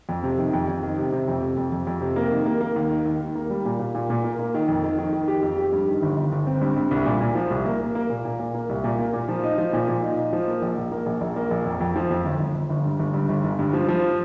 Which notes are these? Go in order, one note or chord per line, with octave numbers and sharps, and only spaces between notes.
F2
C3
D#3
F2
F2
D#3
C3
C3
F2
C3
F2
F2
F2
C3
A#3
D#3
A#3
A#3
D#2
D#3
D#2
D#2
A#3
G3
A#2
A#2
A#2
A#2
A#3
A#3
D#3
F2
D#3
D#3
D#3
G4
F2
G4
G2
D#3
G1
G1
G1
C4
G2
G2
C2
A#2
A#2
F3
C2
A#3
A#3
A#3
A#2
A#2
A#2
A#3
C2
A#2
A#3
A#2
F3
D#4
F3
A#2
A#2
D#4
D#4
F3
A#3
A#1
A#1
A#3
A#1
A#1
A#3
A#1
F2
F2
F3
F2
G1
G1
G1
G1
G2
G1
G2
G1
G1
G2
F3
F3